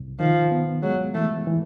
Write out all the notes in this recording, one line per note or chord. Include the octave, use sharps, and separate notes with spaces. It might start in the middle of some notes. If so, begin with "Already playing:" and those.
Already playing: C2
D#3 F3
B3
F#3 G#3
E3 A3
E3